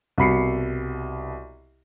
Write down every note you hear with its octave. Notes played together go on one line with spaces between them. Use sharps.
C2 B2 B5 C7 C#7